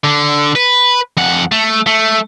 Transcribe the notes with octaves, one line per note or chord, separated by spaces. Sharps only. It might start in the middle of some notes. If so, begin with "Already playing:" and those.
D3
B4
F2 F#5
A3
A3